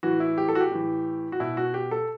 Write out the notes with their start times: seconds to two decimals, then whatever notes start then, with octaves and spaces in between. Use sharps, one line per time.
0.03 A2 E3 F#4
0.20 E4
0.38 G4
0.48 A4
0.55 F#4
0.60 G4
0.71 A2 E3
1.32 F#4
1.40 B2 E4
1.57 F#4
1.74 G4
1.91 A4